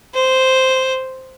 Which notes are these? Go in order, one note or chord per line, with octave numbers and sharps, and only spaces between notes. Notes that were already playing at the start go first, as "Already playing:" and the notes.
C5